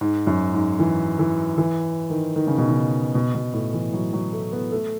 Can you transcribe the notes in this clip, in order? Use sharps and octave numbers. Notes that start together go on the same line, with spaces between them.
G#2
F#2
G#2
E3
E3
E3
D#3
D#3
C#3
B2
C#3
B2
B2
A2
E3
F#3
F#3
A3
B3
A3